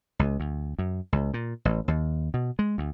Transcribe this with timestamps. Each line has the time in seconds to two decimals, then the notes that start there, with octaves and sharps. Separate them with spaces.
0.19 C#2
0.40 D2
0.79 F#2
1.12 C#2
1.34 A#2
1.65 A1
1.88 D#2
2.34 B2
2.59 G#3
2.78 D2